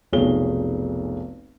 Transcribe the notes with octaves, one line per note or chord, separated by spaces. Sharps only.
F1 B1 G#4 C#5 G7